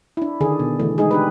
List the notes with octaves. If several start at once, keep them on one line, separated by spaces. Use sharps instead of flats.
D4 E4
D3 D#3 D4 G#4
B2
D3 E3 A3
G#3 D#4 G#4
D4 G4 B4